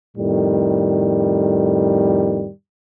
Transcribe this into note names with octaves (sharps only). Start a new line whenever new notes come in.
F2 A2 D#3 G3